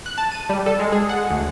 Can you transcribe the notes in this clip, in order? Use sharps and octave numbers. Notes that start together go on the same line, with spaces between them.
F#6
A5
D#7
G3
A4
G#3
G#4
F#5
D2